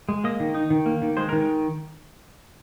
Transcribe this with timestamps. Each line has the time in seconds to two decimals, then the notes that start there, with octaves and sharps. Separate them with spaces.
0.09 G#3
0.24 A#3 D#5
0.40 D#3
0.55 D#4
0.70 D#3
0.86 A#3
1.02 D#3
1.17 G#3 C5
1.29 A#4
1.33 D#3